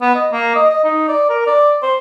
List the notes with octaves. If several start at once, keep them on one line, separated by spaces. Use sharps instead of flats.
B3
D#5
A#3
D#5
D#5
D#4
D5
A#4
D5
C5